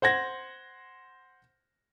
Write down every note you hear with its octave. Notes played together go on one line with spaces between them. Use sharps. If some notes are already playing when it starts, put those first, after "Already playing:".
C5 F#5 G#6 A#6